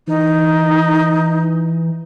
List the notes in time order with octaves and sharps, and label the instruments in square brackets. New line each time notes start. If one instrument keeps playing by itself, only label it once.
[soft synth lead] E3 [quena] D#4